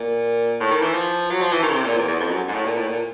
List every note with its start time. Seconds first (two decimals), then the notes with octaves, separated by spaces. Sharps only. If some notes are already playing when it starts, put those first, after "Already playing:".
Already playing: A#2
0.60 A2
0.71 D#3
0.82 E3
0.94 F3
1.30 F#3
1.41 F3
1.52 E3
1.63 D#3
1.69 C#3
1.73 C3
1.85 A#2
1.97 E2
2.08 E2
2.20 F2
2.30 F#2
2.48 G#2
2.54 A2
2.65 A#2
2.77 A2
2.87 A#2